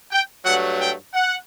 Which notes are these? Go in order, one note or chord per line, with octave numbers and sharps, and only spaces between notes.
G5
G2 F#3 A3 F#5
G5
F#5